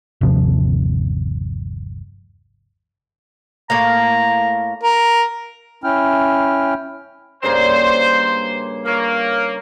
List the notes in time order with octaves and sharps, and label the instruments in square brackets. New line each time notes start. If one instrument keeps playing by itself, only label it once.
[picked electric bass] G1 D#2 C3 F3
[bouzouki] A2 A#3 F5 [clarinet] A#5
[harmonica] A#4
[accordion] C#4 E4 G5 F6
[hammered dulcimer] G2 C#3 A#3 [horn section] C5
[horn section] A#3 [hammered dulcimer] A#4 C#5